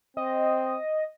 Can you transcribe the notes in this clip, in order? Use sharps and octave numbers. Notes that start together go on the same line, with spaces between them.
C4 D#5